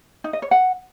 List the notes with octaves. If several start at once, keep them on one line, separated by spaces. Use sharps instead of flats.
D#4
D#5
C#5
F#5